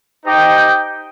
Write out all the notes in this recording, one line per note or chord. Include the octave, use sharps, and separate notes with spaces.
D#4 G4 C5 D#5 G5